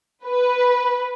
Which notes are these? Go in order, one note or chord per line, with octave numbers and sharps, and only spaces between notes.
B4